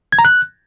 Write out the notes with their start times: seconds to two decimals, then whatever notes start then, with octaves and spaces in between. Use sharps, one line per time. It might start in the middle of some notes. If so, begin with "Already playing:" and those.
0.12 G#6
0.19 A#5
0.25 F#6